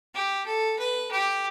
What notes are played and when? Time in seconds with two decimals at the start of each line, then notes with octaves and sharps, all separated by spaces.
0.14 G4
0.46 A4
0.79 B4
1.11 G4